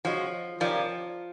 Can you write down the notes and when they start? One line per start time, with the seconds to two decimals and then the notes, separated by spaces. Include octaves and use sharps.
0.05 F3 G#3 C#4 F#4
0.60 D#3 F3 G3 A#3 C#4